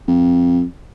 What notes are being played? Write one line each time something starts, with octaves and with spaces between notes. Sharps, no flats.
F2